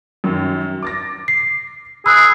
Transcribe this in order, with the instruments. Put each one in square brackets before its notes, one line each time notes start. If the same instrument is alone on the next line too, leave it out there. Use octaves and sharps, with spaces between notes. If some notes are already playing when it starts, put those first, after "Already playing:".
[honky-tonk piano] F#2 D#3
D6 A6 A#6
[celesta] C7
[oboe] G#4 [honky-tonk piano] B5 [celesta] E6 F#6